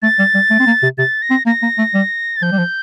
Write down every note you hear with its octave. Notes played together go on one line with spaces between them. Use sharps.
A3 A6
G3
G3
A3
C4
A#3
C3
C3 A6
A#6
C4
A#3 A#6
A#3
A3
G3
A6
F3 G6
G3
F3